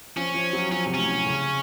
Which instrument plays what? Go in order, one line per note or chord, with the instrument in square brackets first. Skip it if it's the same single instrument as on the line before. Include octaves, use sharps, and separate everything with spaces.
[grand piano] F3 [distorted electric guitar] C#4
[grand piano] F3
F#3
[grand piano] F3 [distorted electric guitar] C#4
[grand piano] C3
[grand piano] A2 [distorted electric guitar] C#4
[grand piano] C3
C#3